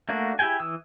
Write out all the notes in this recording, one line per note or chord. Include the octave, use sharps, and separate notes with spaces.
A3 A#3 D4 F#4
E4 G4 G#4 G5 G#5
E3 D#6 E6